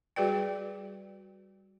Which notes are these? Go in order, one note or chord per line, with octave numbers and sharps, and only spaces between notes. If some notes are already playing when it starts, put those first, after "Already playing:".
G3 F#4 G#4 B4 D5 G5